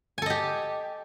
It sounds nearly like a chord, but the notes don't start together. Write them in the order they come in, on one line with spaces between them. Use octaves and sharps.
G#5 A4 D#5 G4